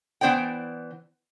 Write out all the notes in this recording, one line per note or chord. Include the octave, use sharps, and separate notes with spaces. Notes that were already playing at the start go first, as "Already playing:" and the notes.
E3 B3 C5 D5 G5